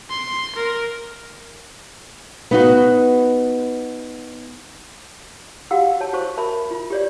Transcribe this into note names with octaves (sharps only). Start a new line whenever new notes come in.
C6
A#4
B3 D#4 F#4
F#4 G4 F5 F#5 E6
C#5 A5
F#4 C5 C#6
A#4 E5 A5 B5
F4
G4 C#5 D5